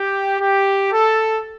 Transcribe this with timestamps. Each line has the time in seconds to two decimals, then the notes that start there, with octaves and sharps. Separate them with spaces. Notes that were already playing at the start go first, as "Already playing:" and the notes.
Already playing: G4
0.39 G4
0.91 A4